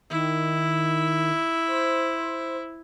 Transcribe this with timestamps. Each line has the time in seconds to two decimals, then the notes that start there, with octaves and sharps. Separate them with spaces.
0.10 D#3 E4
1.67 C5